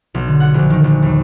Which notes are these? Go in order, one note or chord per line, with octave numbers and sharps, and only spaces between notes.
B1
D3
F#5
A#1
D#3
A#1
D#2